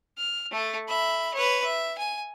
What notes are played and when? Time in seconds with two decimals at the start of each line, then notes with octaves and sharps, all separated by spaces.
0.17 F6
0.52 A3 A4
0.88 E5 B5
1.34 B4 C#5
1.64 E5
1.98 G#5